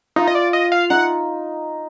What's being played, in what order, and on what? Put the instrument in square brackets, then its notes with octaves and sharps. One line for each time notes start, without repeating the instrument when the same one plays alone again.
[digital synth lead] D#4 [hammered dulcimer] F4
[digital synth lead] D#5
D5
D#5
F5
[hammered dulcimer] D#4 [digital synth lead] F#5